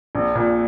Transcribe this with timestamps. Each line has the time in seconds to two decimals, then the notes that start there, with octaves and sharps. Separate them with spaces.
0.15 A#1
0.35 A#2